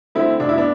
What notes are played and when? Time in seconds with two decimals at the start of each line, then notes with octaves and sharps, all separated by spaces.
0.15 D3 A3 C4 E4
0.40 F1 D4
0.49 E4
0.58 B3 D4